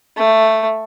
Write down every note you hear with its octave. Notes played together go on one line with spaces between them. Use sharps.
A3